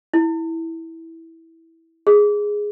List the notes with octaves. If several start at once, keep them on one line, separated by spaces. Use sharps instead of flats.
E4
G#4